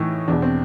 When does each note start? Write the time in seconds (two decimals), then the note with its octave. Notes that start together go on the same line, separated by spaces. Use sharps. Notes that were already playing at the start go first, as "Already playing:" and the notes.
Already playing: A2 E3 D#4
0.28 E2 B2 D4
0.42 C4